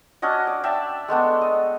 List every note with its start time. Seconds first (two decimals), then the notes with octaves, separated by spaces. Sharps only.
0.22 C#4 D4 F#4 D#5
0.47 D5
0.63 D5 E5 G5 A5
1.08 G#3 A3 B3 D4
1.41 D#5